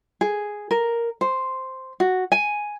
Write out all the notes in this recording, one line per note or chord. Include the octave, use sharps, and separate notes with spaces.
G#4
A#4
C5
F#4
G#5